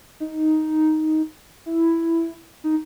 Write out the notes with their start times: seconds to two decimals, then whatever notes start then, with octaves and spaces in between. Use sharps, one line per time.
0.20 D#4
1.66 E4
2.64 D#4